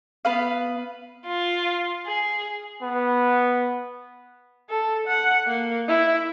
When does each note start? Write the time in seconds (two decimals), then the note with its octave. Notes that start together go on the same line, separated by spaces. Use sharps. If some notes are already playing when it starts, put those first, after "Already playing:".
0.25 B3 B4 F5
1.26 F4
2.06 G#4
2.83 B3
4.70 A4
5.07 F#5
5.47 A#3
5.88 E4